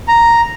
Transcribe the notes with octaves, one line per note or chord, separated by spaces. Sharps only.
A#5